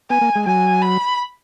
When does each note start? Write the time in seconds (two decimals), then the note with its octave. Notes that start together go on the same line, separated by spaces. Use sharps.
0.10 B3 G#5
0.21 A#3
0.36 G#3
0.46 F#3 G#5
0.82 B5